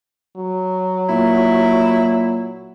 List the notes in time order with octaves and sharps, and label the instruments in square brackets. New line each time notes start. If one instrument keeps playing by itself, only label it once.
[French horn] F#3
[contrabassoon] A#2 [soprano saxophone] E4